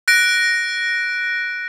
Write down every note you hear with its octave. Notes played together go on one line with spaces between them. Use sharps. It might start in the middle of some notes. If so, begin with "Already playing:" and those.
F#6 A#6 D7